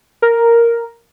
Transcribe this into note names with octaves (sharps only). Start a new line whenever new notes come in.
A#4